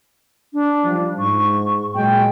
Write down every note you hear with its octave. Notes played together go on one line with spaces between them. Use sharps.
D4
F3 G3
G#2 C#6
A#2 F#3 G#3 G5